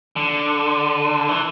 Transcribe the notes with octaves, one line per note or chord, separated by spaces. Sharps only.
D3
E3